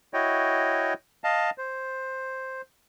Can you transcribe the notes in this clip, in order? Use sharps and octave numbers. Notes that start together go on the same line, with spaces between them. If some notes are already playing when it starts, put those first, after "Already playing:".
E4 F#4 C#5 D#5 G5
D#5 F5 A5
C5